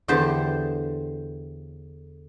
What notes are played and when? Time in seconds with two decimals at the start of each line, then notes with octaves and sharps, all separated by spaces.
0.08 E2 D3 G4 C5 A5